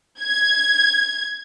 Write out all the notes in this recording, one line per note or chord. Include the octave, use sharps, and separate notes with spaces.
G#6